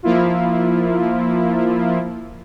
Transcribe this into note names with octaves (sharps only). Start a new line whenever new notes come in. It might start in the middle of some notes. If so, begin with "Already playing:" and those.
F3 A#3 E4 F4